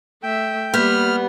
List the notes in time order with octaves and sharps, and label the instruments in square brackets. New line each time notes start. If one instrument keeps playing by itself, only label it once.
[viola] A3 E5 [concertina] G5
[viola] G3 [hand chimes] A#3 G6 B6 [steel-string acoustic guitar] B3 [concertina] F6